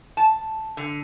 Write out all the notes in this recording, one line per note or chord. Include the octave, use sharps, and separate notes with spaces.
A5
D3